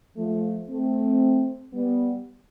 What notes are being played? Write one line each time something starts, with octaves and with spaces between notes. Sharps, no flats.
F3 A3
A3 C4
G3 B3